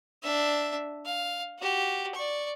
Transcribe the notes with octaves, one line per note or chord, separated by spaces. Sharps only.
D4 E5
F5
F#4 G4
D5 C#6